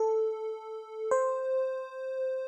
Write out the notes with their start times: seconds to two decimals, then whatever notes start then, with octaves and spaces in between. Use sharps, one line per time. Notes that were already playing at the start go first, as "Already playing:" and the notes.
Already playing: A4
1.11 C5